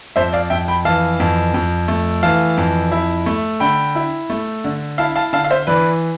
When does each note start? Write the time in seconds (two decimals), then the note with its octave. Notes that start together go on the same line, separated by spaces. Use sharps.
0.16 F2 C5 E5
0.33 D5 F5
0.50 F2 E5 G5
0.68 G5 B5
0.85 E3 F5 A5
1.20 F2
1.54 F2
1.88 A3
2.23 E3 F5 A5
2.57 F2
2.92 E4
3.26 A3
3.60 D3 G5 B5
3.95 E4
4.30 A3
4.64 D3
4.98 E4 F5 A5
5.16 F5 A5
5.33 D3 F5 A5
5.45 F5
5.50 C5 E5
5.67 E3 B4 D5